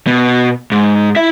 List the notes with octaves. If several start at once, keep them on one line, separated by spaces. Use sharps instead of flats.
B2
G#2
E4 E5